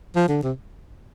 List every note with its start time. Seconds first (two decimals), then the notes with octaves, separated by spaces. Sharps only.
0.16 F3
0.29 D3
0.43 C3